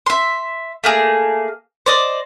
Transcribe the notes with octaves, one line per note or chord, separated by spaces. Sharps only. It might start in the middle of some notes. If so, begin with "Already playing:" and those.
E5 C6
A3 A#3 G#4
C5 D5 D#5